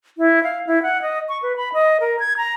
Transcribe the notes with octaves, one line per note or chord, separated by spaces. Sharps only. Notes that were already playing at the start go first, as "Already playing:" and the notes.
E4
F5
E4
F#5
D#5
C#6
B4
B5
D#5
A#4
G#6
A#5